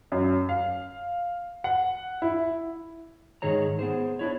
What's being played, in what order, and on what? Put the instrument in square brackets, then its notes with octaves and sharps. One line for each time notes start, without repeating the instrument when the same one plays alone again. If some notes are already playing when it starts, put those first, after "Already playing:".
[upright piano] F#2
F5
F#5
E4
[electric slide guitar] G#2 D#3 G#4 C#5 A#5
B3 G#4 C5
D4 E4 C#5